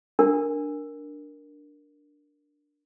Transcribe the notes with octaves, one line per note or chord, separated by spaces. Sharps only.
D4 A#4